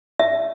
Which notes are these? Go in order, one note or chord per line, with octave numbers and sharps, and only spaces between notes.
E5